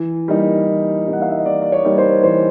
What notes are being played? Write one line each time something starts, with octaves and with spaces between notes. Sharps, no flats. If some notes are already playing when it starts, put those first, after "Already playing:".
Already playing: E3
G3 A#3 D#4
E3
G3 A#3 D#4
F#5
F5
E5
D#5
E3 D5
D5
C#5
G3 A#3 D#4
C5
E3 C5